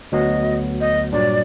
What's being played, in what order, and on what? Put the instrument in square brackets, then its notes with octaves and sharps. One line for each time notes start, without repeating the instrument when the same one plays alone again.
[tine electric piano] D2 F#3 B3 [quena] D#5
[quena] D#5
[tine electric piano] G2 A#2 F#3 [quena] D5